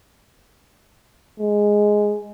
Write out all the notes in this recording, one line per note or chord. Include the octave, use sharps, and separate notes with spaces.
G#3